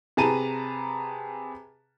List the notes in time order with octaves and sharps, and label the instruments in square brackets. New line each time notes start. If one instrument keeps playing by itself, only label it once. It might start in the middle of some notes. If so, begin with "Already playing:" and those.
[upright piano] C3 G#4 B4 A5 A#5 D#7